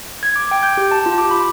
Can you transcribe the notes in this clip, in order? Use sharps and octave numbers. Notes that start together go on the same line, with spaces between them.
G#6
D6
G5
G6
G4
A5
F4
D6
B5